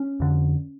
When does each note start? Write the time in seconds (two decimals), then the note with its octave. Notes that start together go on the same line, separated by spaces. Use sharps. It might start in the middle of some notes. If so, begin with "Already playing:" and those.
Already playing: C#4
0.20 F2 D3